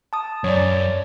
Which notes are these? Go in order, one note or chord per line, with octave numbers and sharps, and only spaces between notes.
A5 D#6
F#2 C#5 D5